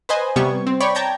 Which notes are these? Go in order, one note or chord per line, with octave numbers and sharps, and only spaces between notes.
B4 C5 D#5 G#5
C3 G3 B3 C#6 G#6
C4
C#5 D5 G5 B5 C#6
G5 A5 A#5 G6 G#6